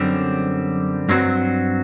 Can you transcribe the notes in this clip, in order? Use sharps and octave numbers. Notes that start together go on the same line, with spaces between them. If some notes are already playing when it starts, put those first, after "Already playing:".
Already playing: F#2 D3 G3 C4
G2 F#3 C4 F#4